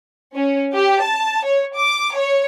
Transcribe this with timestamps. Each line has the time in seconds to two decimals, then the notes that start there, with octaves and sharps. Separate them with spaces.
0.36 C#4
0.74 G4
1.02 A5
1.45 C#5
1.77 D6
2.16 C#5